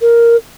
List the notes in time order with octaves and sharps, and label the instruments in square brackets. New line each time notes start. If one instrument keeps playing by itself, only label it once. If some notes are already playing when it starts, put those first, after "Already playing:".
[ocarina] A#4